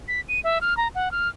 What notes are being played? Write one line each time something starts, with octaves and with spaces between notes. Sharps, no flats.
B6
D#7
E5
F6
A#5
F#5
F6